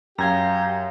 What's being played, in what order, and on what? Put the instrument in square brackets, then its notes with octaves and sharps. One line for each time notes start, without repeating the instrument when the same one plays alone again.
[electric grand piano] F#2 G#6 [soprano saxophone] G4 [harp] F5 A#5